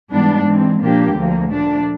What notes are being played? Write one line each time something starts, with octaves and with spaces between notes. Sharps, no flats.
G#2 E3 G3 B3 D4
E3 G#3 C4
A#2 F3 A#3 D4 G4
D2 D3 F3 A#3
A#2 F3 A3 D4